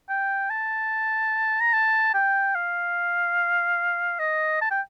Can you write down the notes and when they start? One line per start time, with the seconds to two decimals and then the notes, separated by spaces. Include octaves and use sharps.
0.09 G5
0.50 A5
1.60 A#5
1.73 A5
2.14 G5
2.55 F5
4.20 D#5
4.61 A5
4.71 G5